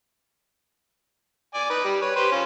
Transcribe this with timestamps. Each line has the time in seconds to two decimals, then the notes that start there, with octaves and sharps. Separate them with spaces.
1.55 D5 G#5
1.70 D#4 B4
1.84 G3
2.01 B4 C#5
2.16 G4 B4 C5
2.32 C#4 F4